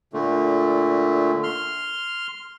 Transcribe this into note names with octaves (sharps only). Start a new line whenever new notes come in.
A#2 D3 A3
C6 F6